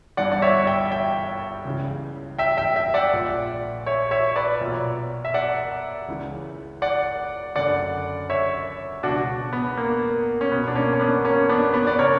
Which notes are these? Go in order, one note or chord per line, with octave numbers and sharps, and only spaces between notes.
G1 G2 E3 D5 F#5
D5
C#5 E5
E5 G5
E5 G5
C#2 C#3 E3
E5 G5
E5 G5
E5 G5
D5 F#5
A#1 A#2
C#5 E5
C#5 E5
B4 D5
B1 A#2
E5
D5 F#5
C#2 C#3 E3
D5 F#5
F#1 F#2 D3 D5 F#5
C#5 E5
C#2 B2 D4 F#4
B3
A#3
C#4
B1 B2 B3
D4
A#3 C#4
C#4
B3 D4
A#3 C#4
B3 D4
B3 D4
D5
C#3 A#4 C#5